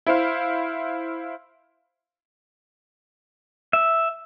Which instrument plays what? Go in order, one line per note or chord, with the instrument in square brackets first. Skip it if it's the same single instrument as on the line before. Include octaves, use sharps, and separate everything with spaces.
[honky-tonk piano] E4 C5 F5
[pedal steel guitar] E5